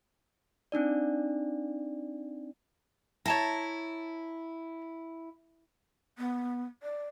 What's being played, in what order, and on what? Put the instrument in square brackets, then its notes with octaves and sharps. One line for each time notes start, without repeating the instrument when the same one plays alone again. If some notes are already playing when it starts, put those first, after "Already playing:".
[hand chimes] C4 D4 D#4 D5
[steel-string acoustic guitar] E4 [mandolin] C#5 A5 A#5
[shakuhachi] B3
D5